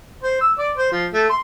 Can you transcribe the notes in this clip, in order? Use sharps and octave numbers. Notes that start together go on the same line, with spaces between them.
C5
E6
D5
C5
F3
A3
C6